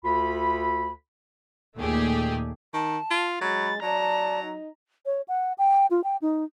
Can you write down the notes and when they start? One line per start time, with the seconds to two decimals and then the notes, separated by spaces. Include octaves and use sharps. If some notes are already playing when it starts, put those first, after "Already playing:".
0.04 D2 F4 A4 B5
1.76 D#2 A#2 A3 G4 G#4
2.74 D#3 A5
3.10 F4
3.41 F#3 G#3 B5 A6
3.82 F#3 D5 A5 A#5
4.43 D#4
5.06 C#5
5.28 F#5
5.58 G5
5.91 F4
6.04 G5
6.22 D#4